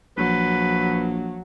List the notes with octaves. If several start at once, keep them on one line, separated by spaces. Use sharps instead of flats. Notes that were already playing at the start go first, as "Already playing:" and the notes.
A#1 F3 F#3 B4